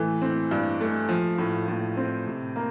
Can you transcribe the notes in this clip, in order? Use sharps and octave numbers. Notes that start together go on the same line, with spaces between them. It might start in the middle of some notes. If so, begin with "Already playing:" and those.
Already playing: A2 E3 A3
C4
G2
A3
F3
A2
A2
C4
C3
A#3